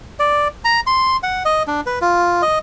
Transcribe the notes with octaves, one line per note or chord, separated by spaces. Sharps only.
D5
A#5
C6
F#5
D#5
D4
B4
F4
D#5